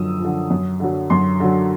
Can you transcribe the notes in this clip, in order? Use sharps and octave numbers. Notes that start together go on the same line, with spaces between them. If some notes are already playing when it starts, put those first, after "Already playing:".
Already playing: F#2 D3 F3 D#6 E6
D3 F3
F#2
D3 F#3
F#2 C6
D3 F#3